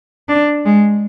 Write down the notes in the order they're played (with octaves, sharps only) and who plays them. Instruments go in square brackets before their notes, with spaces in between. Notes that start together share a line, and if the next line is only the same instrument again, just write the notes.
[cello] D4
G#3